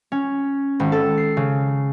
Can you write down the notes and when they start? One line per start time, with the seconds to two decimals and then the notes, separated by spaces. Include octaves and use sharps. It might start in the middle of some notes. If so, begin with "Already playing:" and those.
0.12 C#4
0.80 G#1
0.92 A4
1.18 C7
1.37 C#3